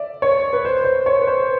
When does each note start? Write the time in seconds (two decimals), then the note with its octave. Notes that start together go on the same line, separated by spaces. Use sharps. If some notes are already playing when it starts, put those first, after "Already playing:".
Already playing: D5 E5
0.22 C#5
0.53 B4
0.65 C5
0.84 C5
1.06 C#5
1.22 B4
1.27 C5